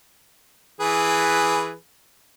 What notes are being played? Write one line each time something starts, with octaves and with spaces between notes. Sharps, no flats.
E3 G#4 B4